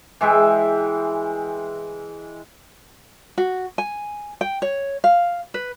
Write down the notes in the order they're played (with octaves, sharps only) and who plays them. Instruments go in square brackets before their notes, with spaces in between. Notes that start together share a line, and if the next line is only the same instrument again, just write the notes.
[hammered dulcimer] E3 G#3 E5 G5
[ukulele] F#4
G#5
G5
C#5
F5
B4